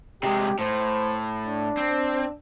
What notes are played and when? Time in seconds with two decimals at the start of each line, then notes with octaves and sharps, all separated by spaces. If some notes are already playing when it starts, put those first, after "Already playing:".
0.23 C3 G#3 G4
0.59 A2 C5
1.47 D4
1.77 C4